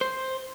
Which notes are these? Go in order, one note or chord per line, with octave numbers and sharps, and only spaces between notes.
C5